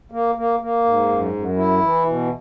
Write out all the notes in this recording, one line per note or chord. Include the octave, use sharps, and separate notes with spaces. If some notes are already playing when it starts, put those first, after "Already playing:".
A#3
A#3
A#3
G#2
F#2
F#2
E4
E3
B2